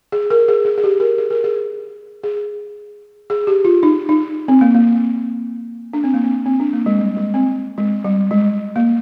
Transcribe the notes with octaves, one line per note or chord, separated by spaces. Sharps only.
G#4
A#4
G#4
G#4
G#4
G4
A#4
G#4
A#4
G#4
G#4
G#4
G4
F4
D#4
D#4
C4
A#3
A#3
D4
C4
A#3
C4
C4
D4
A#3
G#3
G3
G#3
C4
G#3
G3
G#3
A#3